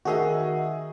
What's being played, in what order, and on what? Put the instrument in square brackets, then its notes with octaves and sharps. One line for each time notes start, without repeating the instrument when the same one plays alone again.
[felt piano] D#3 G#4 D#5 [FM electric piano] F#4 E5